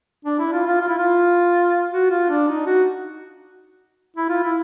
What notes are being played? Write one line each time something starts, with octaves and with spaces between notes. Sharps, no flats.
D4
E4
F4
F4
F4
E4
F4
F#4
F4
D4
D#4
F#4
E4
F4
E4